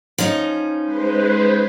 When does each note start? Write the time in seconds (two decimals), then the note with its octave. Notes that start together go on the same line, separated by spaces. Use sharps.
0.18 F3 C#4 D#4
0.83 G#3 B4 C5